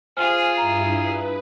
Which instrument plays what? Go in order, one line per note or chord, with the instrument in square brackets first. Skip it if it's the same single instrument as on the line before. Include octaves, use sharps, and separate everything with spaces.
[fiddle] F4 G#4 [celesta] C5 G#5 F6
[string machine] G2 E4 D#6 [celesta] A#5
[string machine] B4